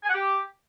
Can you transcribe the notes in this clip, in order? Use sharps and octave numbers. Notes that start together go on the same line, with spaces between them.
G#5
F#5
G4